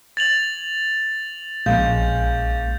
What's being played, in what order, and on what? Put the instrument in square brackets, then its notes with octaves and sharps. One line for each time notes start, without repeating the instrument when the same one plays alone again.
[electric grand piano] G#6 [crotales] A6 F7 F#7
[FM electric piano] A#1 [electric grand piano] G#3 A#3 C#4 [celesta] F5 [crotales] G6